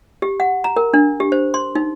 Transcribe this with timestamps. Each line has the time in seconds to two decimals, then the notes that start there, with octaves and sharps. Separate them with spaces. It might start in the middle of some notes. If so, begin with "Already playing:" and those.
0.22 G4
0.40 F#5
0.64 A#5
0.76 A#4
0.94 D4
1.20 G4
1.32 C5
1.54 C6
1.75 D#4